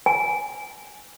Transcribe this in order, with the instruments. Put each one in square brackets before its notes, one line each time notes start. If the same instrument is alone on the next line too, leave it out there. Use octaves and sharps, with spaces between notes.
[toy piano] G#5